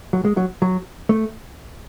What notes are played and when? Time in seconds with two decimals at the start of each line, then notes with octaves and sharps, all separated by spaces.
0.13 F#3
0.25 G#3
0.37 F#3
0.62 F#3
1.09 A3